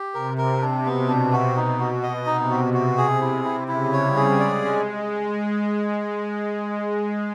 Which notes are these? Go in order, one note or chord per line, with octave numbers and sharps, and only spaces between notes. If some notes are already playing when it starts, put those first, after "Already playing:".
Already playing: G4
C3 A#4
A#4
D4
B2 B3
D4
F#4
D#4
F#4
D#5
C3 D#4
F#4
F#4
G#4
E4
E4
C#3 E4
C#5
G3
G#4
G#3 D5
C#4